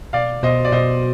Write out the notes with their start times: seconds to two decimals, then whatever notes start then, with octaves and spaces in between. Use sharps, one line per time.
0.13 B2 D5 F5
0.43 B2 C5 D#5
0.65 D5
0.72 B2 C5 D#5